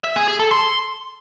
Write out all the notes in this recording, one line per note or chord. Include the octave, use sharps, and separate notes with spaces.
E5
G#4
G#4
A4
C6